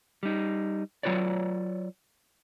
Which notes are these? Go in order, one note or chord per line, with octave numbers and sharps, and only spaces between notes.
G3 D#4
F#3 G3 F4 B4 C#5 D5